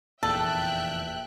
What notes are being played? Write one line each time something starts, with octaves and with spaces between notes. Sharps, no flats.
F1 E2 A#2 A4 E5 G5 F#6